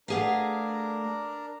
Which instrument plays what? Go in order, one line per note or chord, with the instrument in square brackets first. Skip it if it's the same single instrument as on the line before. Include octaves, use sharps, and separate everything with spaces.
[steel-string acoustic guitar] A3 G#4 F5 [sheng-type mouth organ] D4 A#4 [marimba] B4 F#5